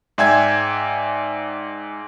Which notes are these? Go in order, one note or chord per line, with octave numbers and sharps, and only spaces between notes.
G#2 D5 E5 G5 G#5 G#6